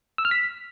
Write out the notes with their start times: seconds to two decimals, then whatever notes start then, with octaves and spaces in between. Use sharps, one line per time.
0.18 E6
0.25 F6
0.31 B6